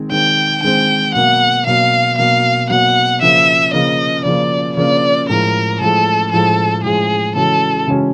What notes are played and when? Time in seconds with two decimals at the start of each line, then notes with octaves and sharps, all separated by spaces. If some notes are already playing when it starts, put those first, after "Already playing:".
Already playing: D#3 G#3 C4
0.11 D#3 G#3 C4 G5
0.63 D#3 G#3 C4 G5
1.15 B2 F#3 A#3 F#5
1.67 B2 F#3 A#3 F5
2.18 B2 F#3 A#3 F5
2.70 B2 F#3 A#3 F#5
3.22 C#3 F3 A#3 E5
3.73 C#3 F3 A#3 D#5
4.25 C#3 F3 A#3 D5
4.77 C#3 F3 A#3 D5
5.29 A2 F3 G#3 A#4
5.81 A2 F3 G#3 A4
6.32 A2 F3 G#3 A4
6.84 A2 F3 G#3 G#4
7.35 C#3 E3 G#3 C#4 F#4 A4
7.87 C#3 E3 G#3 C#4 F#4